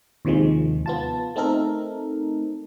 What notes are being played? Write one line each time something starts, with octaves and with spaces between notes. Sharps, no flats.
D#2 C3 D#3 F3 G#3
B3 F4 A5
A3 C4 D#4 A4 A#4